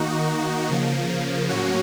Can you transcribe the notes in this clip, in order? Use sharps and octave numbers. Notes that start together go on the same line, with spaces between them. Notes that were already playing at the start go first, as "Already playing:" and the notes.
Already playing: D#3 A#3 D#4 F#4
C#3 F3 A#3
A2 F#3 A#3 C#4 F#4